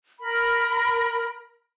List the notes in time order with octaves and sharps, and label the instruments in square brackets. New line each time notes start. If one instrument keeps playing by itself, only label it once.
[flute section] A#4 B5